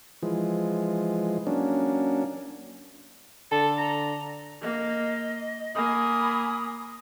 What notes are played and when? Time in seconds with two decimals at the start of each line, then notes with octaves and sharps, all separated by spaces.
0.23 E3 F3 G#3
1.47 F#3 A#3 C#4 D4
3.52 D3 A4 A5
3.78 A#5
4.61 A#3 D#5
5.75 A#3 G#5 B5 D#6